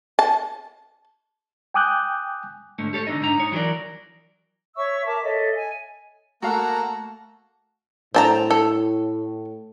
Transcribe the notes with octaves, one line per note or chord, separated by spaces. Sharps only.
A5
G5 G#5 D6 D#6 F#6 G6
G#2 D3 A3
G4 A4 C#5
C#2 D3 F3 D#4 D#5
G#2 D4 D#4 A#5
D#4 C#5
E3 F#3 G4 A#4 D5
C#5 E5 C#6 E6
A#4 E5 A5 D6
A4 C#5 D#5 E5
G#5
A3 A#3 F#4 F5 F#5 A5 A#5
A2 C4 A5 A#5
A4